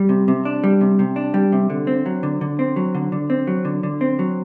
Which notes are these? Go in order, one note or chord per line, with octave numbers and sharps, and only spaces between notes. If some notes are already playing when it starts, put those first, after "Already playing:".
Already playing: G3
C3
C3
D4
G3
C3
C3
D4
G3
C3
D3
C4
F#3
D3
D3
C4
F#3
D3
D3
C4
F#3
D3
D3
C4
F#3